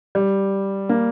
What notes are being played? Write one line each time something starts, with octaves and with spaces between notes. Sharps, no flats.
G3
A#3